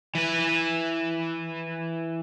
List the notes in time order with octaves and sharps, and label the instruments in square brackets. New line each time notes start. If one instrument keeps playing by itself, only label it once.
[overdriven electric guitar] E3 B4